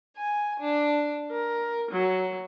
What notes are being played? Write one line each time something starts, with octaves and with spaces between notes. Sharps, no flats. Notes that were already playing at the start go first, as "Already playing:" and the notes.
G#5
D4
A#4
F#3